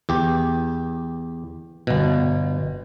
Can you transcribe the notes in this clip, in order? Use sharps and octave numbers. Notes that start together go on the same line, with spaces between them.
E2 G4
G1 B2